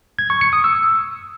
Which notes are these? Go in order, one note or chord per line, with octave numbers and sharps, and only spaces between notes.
G#6
C#6
C#7
D#6
E6